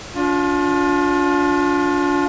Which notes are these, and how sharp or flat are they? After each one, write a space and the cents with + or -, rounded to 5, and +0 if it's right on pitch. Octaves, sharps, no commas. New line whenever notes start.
D4 -30 F4 +30